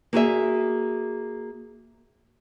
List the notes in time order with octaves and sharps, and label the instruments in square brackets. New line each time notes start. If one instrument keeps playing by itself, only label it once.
[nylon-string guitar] A#3 F#4 G#4 E5